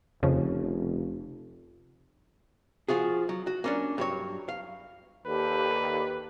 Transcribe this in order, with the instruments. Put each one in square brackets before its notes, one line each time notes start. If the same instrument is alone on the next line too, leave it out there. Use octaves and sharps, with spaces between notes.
[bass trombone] F1 [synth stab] F2 C#3
[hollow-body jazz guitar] F3 F4 F#4 G#4
F#3
F#4
A#3 C#4 D4
G2 F#3 C#5
F5
[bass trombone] D#2 [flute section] G4 A4 D5 [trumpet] B4